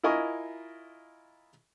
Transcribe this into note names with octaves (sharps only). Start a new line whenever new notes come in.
E4 F4 A#4 D#5 G#5 C#6